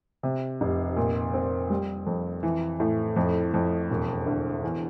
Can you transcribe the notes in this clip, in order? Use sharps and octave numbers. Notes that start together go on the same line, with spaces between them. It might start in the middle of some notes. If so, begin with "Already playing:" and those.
C3
F1
A#2
C4
G3
F2
E3
A2
F2
F2
E1
D2
E2